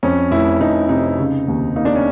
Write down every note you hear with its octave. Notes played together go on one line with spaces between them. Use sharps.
F2 C#4
F1 E4
F1 D#4
C3 D#4
C#3
D#2
A#3 D#4
D4
C#4